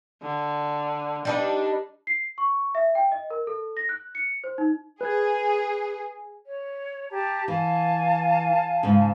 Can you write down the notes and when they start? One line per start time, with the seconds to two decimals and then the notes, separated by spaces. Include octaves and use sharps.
0.22 D3
1.25 G3 D4 D#4 B4
2.07 C7
2.38 C#6
2.75 E5
2.95 G5
3.12 D#5
3.30 A#4
3.47 A4
3.77 A#6
3.89 F#6
4.15 C#7
4.44 C5
4.58 D#4
5.01 G#4 B4 G#6
6.46 C#5
7.10 G4 A5 A#5
7.48 E3 F5 G#5 A5
8.83 G#2 C#3